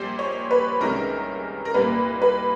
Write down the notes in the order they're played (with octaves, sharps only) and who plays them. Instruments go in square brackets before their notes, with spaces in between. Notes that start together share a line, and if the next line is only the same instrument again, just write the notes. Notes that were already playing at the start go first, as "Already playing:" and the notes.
Already playing: [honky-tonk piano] A#1 A#2 G3 C5
C#5
B4
C2 C3 D#3 G#3 C#4 A#4
A#4
C2 A#2 G3 A#3 B4
B4